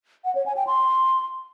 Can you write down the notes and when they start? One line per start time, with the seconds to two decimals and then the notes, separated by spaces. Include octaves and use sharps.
0.25 F#5
0.35 C#5
0.46 G#5
0.56 G5
0.67 C6